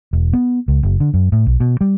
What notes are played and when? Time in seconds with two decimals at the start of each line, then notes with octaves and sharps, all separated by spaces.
0.13 E1
0.33 B3
0.68 C#2
0.83 F#1
1.00 D3
1.14 F#2
1.32 A2
1.46 B1
1.60 B2
1.81 G3